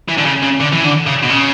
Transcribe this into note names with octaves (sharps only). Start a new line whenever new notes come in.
E3
D3
C#3
C#3
D3
E3
D3
C#3
B2
C#3